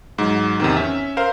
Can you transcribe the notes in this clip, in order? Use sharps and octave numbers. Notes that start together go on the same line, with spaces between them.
G#2 F#3
E2 C3 D#3
C#4 E5
A#4 C5 F5